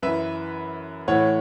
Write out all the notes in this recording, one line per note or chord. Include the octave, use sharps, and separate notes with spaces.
F#2 E3 B4 E5
A2 E3 C#5 F#5